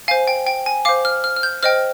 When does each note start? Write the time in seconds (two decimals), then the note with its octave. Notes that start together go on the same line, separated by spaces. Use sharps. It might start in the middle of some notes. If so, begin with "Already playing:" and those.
0.08 C5 F5 G#5
0.28 G5
0.47 G5
0.66 G#5
0.85 C5 F5 D6
1.05 F6
1.24 F6
1.36 F6
1.43 G6
1.63 C5 D#5 G5 F6